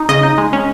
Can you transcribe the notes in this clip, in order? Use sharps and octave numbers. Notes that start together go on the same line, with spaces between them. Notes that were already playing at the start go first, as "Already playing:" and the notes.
Already playing: D#4
C#3 D#5
D#4
G#3
C#4